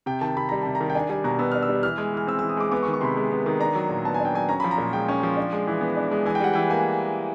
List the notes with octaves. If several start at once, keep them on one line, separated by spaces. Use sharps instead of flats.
C3 G5
D#3 A5
C3 B5
G3 A#5
C3 A5
A#5
D#3
G5
D4 G#5
G3 G#5
B2 A#5
B3 E6
D4 F6
E6
G3
E3 F6
G#3
E3 F6
C4 E6
E3 E6
D#6
G#3 D6
B3 D6
C#6
D#3
C#6
C3 B5 C6
G#3
B3
D#3
D4 A#5
F#3
A#2
B3 A5
G#5
D4
G5
F#3 G#5
C#4 A#5
F3 B5
A#5
A#2
G#3 G5
C#4
F3
D4
G#3
E3
B3
D4
G#3
E3 G#5
G5
G3 F#5
E3 G5
A#3 G#5